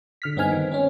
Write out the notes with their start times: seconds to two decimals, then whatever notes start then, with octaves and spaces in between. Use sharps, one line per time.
0.22 D3 F6 B6
0.36 G2 B3 C4 D#4 G#5 F6
0.51 D#3
0.72 C4 C#4